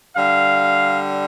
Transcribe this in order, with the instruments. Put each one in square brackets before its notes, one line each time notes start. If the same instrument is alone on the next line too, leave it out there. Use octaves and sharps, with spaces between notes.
[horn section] D3 G3 F5